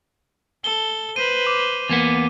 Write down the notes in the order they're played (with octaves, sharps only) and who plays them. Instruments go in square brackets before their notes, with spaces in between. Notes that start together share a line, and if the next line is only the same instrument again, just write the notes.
[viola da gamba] A4 [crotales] G7
[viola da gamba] B4 C5 [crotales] D#7
[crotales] D6
[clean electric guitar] E2 A#3 B3